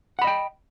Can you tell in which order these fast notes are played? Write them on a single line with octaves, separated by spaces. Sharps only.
F#5 B5 D#5 G5